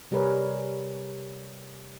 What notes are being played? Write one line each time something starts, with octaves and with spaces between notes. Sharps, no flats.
C3 G3 G#4 A#4 B4 C#5